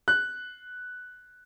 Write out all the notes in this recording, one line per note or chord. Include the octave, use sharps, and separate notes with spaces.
F#6